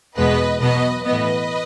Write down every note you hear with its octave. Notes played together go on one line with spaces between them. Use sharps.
E2 B2 G#3 B3 B4 D#5
B2 F#3 B3 B4 D#5
A2 E3 B3 B4 D#5